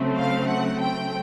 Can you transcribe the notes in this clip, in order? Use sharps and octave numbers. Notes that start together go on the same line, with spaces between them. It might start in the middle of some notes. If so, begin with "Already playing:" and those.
Already playing: C#3 F#3 A3 C4
F5
F#5
G5